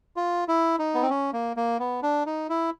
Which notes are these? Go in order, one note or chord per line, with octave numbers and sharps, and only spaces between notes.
F4
E4
D#4
B3
C4
C#4
A#3
A#3
B3
D4
D#4
E4